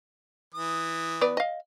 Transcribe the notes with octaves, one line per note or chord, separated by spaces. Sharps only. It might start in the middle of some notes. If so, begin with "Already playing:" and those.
E3 D#6
B3 B4 D5
D#5 F5